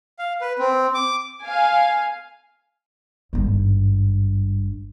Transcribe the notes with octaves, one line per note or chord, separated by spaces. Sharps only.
F5
B4
C4
D6
F5 G#5
G#1 G2